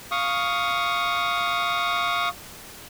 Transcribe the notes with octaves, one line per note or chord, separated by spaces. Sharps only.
F5 C#6 D#6